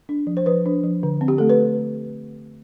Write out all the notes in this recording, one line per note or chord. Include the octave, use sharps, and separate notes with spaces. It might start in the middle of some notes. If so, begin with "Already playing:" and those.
D4
F3
C5
F3 B4
D4
F3
D3
C4
G4
A3 A4
B4